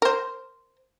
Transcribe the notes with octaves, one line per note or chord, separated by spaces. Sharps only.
A#4 C5